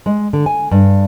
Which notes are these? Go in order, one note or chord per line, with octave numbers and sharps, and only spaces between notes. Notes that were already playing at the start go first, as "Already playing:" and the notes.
G#3
D3
G#5
G2